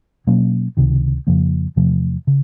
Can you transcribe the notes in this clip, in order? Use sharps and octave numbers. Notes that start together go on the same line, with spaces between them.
B2 F#3 A#3 C#4
C#2 C3 D#3
F2 C#3 F3 A#3
E2 C3 F3 A3
C#3